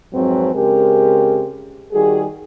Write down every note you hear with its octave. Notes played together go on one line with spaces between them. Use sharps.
F2 G#2 F3 F#3 C4 B4
C#3 G#3 C4 G4 A#4
D#3 G3 F#4 G#4